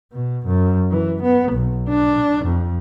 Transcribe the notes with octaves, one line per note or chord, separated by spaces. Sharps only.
B2
F#2
E3
B3
B1
D4
F2